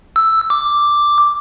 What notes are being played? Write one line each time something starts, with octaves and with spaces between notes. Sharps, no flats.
E6
D6